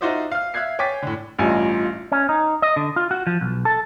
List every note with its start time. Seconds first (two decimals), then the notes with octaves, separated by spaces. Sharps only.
0.01 D#4 F4 F#4 C5 D5 E5
0.32 F5 F6
0.54 E5 F5 F#6 G#6 C7
0.79 C#5 G5 G#5 D6 A6 B6
1.02 A2 D3
1.39 A1 G2 F4 D#5 G#5
2.12 C#4
2.29 D#4
2.62 D#5
2.76 D3
2.96 F4
3.11 F#4
3.27 F3
3.41 B1
3.65 A4